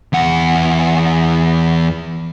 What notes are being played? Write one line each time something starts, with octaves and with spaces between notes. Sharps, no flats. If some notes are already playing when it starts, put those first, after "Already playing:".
E2 F#5